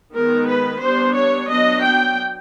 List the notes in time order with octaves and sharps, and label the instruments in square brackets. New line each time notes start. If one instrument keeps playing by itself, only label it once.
[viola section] D#3 G#3 B3 A#4
B4
G3 B3 D4 C5
C#5
F#3 B3 D4 D#5
G5